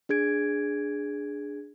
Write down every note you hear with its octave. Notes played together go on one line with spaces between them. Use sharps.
D4 G#4 G#6 D7